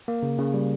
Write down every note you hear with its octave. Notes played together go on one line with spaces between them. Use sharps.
A#3
C#3
C#3
G3